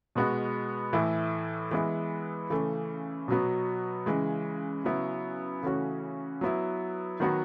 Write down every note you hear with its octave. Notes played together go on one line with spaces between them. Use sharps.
B2 G#3 B3 F#4
A2 E3 A3 E4
E3 G#3 B3 E4
C#3 E3 A3 C#4
B2 F#3 B3
C#3 E3 G#3
C#3 F#3 B3 E4
C#3 E3 A3 C#4 F#4
F#3 B3 E4
D#3 F#3 B3 F#4